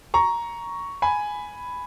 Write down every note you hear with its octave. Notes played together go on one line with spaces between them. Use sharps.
A#5 C#6
G#5 B5